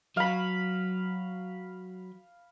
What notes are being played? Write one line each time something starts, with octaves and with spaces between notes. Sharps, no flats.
F#3 F5 B5